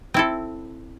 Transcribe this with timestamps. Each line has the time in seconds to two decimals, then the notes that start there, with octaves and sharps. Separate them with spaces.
0.14 C4 E4 A4